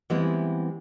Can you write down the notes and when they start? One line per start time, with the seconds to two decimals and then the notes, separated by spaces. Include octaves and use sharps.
0.10 E3 G3 G#3 B3 C4 E4